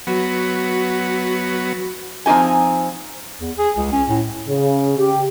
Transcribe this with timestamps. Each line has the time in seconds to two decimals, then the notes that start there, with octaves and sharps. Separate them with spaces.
0.07 F#3 B3 F#4
2.26 F3 C4 D#4 G4 G#5
3.41 E2
3.58 G#4
3.77 C#2
3.92 C#4
4.09 A2
4.47 C#3
4.97 G4